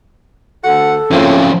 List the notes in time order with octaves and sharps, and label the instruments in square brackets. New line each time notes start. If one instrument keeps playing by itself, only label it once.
[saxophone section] D2 F#5 [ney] A4
[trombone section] C#3 C4 F4 [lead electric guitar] F3 C#4 [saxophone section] A3 A#3 E4